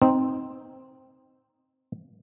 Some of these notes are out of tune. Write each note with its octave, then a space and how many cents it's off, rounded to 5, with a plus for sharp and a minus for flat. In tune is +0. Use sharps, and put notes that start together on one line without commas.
C4 +0 D#4 +0